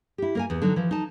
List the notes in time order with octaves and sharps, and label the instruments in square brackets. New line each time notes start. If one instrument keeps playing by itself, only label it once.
[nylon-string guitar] E4 G4
A#3 A#4 G#5
E2
D3 F#3 D#4
E3 F3
D#4 A5